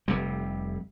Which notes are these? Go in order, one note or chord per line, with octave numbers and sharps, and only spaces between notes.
F1 C3 G3